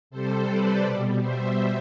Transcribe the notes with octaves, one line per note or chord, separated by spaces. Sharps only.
C3 G3 A4 C5
B4 D5
B2 G3
C5 E5